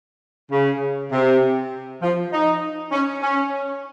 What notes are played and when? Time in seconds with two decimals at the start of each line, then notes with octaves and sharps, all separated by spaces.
0.52 C#3
1.12 C3
2.02 F3
2.33 D#4
2.92 C#4
3.22 C#4